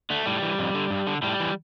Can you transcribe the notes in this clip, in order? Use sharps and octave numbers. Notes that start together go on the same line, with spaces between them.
D3 A3
A2 G3
E3
F2
D3
G2
D3
A2 G3
E3